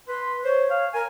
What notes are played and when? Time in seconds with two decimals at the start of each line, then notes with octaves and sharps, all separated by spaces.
0.08 B4 C6
0.44 C5 C#5
0.70 F5
0.94 A#4 G#5